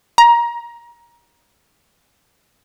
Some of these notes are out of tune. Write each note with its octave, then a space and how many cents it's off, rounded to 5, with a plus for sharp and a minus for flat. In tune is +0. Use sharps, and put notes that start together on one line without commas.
A#5 +20